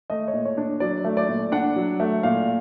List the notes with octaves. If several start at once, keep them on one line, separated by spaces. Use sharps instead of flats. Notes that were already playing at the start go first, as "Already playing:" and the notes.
A3 D#5
C#5
A#2
C#5
D4
F#3 D5
A3
D5
A#2
D4 F#5
F#3
A3
A#2 F5